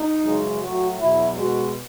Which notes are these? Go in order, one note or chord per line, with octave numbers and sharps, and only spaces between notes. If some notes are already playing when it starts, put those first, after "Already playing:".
Already playing: D#4
F#2 C#3 E3 G#3
A2 F#3 F#4
E2 B2 F#3 E4
B2 G#3 F#4